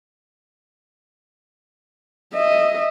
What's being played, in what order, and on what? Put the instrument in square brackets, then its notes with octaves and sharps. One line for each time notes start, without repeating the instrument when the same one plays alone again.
[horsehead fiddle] D#5 E5